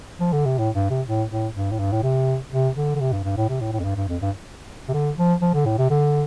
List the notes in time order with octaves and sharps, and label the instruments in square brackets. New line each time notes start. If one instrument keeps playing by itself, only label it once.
[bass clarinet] F3
D3
C3
A2
G2
C3
A2
A2
G2
A2
G2
A2
C3
C3
D3
D3
C3
G2
G2
A2
C3
A2
A2
F2
G2
G2
F2
G2
C3
D3
F3
F3
D3
A2
C3
D3